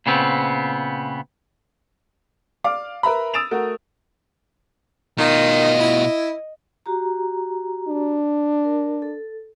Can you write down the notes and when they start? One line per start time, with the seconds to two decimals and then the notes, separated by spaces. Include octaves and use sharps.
0.06 A#2 C#3 B3 C4
2.64 D5 F5 D6
3.03 A#4 B4 E5 A#5 B5
3.34 D#6 E6 A6 D7 E7 F7
3.51 A3 F#4 A#4
5.18 B2 D#3 F4 D#5
5.80 E4
6.86 F#4 G4 A#5
7.88 D4
8.65 A#4
9.02 A4